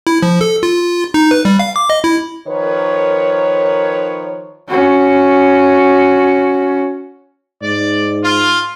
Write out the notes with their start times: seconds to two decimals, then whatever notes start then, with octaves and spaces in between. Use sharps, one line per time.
0.07 E4
0.22 F3
0.41 A4
0.63 F4
1.14 D#4
1.31 B4
1.45 G3
1.59 F5
1.76 D6
1.90 D#5
2.04 E4
2.48 D#3 F3 A#4 B4 C#5
4.68 C#4 F#4
7.62 G#2 D5
8.22 F4